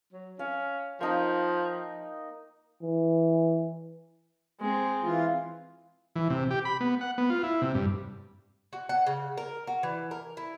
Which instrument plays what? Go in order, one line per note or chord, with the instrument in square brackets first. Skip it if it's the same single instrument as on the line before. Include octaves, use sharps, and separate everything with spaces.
[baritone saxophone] F#3
[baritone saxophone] C#4 [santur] F5
[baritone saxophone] F3 [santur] A#3 D#4 G5
[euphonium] E3
[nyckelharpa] G#3 C4
[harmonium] E3 F4
[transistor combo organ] E3
C3
G4
B5
B3
F#5
B3
F4
E4
C3
G2
[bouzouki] F#4
F#5
C#3
A#4
F#4
E3
A#4
E4